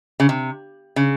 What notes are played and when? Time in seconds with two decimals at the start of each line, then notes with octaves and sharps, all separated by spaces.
0.20 C#3
0.29 C3
0.96 C#3